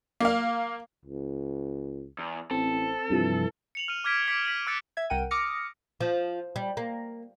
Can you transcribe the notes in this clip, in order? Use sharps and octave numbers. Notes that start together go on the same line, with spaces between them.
A#3 F5
C#2
E2
A1 C4 A4
G2 C3 E3 F3
C#7 F7 F#7
F6 D#7
D6 F6 G#6 B6 D7
D6 B6 C#7 D7
B6 D#7 F#7
D6 E6 F#6 A6 C#7 D7
E5 G#6
C2 A#4 F#5 G5 D#7
D6 D#6 F6 A#6 C#7
F3
G3
A#3